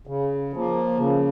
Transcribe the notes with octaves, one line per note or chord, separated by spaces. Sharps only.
C#3
F3 A#3
C#3